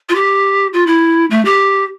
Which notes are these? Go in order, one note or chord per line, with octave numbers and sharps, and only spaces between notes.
F4
G4
F4
E4
A3
G4